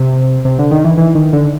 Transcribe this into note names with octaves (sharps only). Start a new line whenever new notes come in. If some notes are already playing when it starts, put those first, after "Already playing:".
Already playing: C3
C3
D3
D#3
E3
E3
D#3
D3